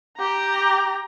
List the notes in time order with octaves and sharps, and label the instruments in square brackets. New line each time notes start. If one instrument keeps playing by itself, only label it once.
[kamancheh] G4 A#5